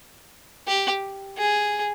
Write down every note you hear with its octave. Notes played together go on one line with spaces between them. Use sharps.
G4
G#4